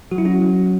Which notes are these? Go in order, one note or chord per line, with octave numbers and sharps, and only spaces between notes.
F#3 F#4
E4
C#4 F#4
F#3